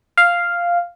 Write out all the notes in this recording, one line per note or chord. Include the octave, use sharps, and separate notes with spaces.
F5